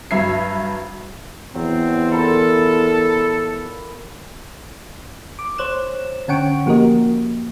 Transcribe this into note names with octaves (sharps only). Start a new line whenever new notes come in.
G2 F#3 E5 G#6 C7
E2 F#3 C4
E4 F4 A4 A#4
D6
C5 C#5 F#6 E7
D3 C#4 F#5 G5 C#6 D7
F3 A#3 F#4 G4 A#4 D#5